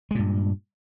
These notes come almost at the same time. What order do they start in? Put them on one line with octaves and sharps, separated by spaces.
G#3 A#2 G2